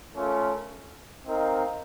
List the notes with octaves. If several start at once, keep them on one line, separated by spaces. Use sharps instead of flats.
A3 C#4 F4 A#4
C4 D#4 A#4 F5